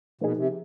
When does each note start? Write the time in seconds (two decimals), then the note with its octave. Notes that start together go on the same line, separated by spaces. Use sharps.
0.21 B2 F3 A#3 D#4 G#4
0.37 C3